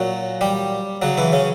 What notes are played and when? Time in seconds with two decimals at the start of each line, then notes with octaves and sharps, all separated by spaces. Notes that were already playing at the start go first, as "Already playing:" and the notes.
Already playing: A#2 F#3 F#4
0.41 G3 G4
1.02 C#3 F#3 F#4
1.18 E3 E4
1.33 C#3 C#4